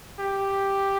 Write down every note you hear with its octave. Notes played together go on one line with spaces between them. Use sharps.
G4